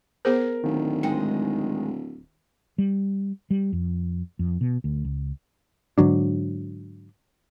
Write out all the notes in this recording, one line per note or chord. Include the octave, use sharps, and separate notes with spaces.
B3 G#4 A#4 C5
D1 D#3
G#2 G#3 D#5 G5
G3
G3
F2
F2
B2
D2
C#2
G#2 D3 F#3 D4